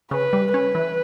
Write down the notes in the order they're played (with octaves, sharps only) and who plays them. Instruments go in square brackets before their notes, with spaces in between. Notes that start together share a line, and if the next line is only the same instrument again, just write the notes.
[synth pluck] C#3 [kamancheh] B4
[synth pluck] G3
[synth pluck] C#4 [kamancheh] B4
[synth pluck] E3